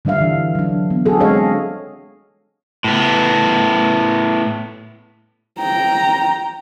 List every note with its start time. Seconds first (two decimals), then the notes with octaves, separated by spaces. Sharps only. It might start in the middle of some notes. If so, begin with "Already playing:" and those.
0.05 D3 G3 D4 E5 F5
0.21 E3
0.55 F#3 D4
0.90 B3
1.06 D4 F#4 G#4 A4
1.20 G#3 C4 C#5 D#5 F5
2.84 A2 B3
5.59 G5 A#5